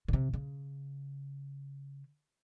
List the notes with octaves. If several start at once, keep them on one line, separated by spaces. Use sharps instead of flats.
B2
C3
C#3